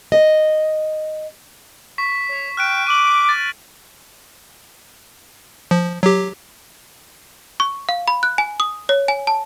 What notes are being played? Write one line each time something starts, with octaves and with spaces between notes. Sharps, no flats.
D#5
C#6 B6
C#5
G5 F6 F#6 D7
D6 D#7 F#7
A6
F3
F#3 G4
C#6
F5
B5
F#6
G#5
D#6
C#5
G#5
A5